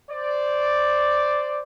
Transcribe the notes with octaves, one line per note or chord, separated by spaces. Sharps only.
C5 D5